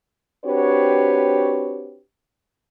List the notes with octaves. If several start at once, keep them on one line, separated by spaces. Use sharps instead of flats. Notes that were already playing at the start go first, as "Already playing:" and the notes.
C4 D4 F#4 G4 B4 C#5